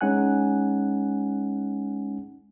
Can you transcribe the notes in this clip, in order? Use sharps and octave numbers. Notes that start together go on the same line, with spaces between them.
G#3 C#4 D#4 F#5 G#5 F#6